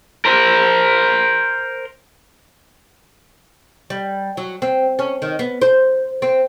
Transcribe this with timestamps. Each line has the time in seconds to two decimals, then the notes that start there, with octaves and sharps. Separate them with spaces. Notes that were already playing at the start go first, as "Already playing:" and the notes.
0.25 A#4 C5
3.90 G3
4.37 F#3
4.62 C4
4.99 C#4
5.22 D#3
5.39 B3
5.61 C5
6.22 C4